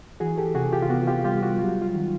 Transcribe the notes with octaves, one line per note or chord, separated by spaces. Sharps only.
E3 F#4 G#4
G4 A4
C3 F#4 G#4
F4 G4
F4
B3 F#4
F4 G4
G3 F4 G4
F#4
F#3 F4
F4
D#3